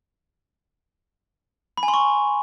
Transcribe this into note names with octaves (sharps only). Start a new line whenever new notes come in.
B5
G#5
C6
C#6